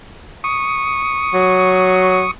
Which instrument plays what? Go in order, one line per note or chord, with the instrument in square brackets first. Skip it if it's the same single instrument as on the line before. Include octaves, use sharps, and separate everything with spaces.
[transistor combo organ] C#6 D#6
[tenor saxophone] F#3